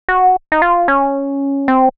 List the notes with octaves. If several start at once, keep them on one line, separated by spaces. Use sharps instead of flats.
F#4
D#4
F4
C#4
C4